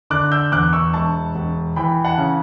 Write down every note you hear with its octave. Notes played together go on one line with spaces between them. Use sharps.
D3 D6 F#6
E6 G6
E2 D6 F#6
C#6 E6
E1 A5 C#6
E1
E3 G5 B5
F#5 A5
C#3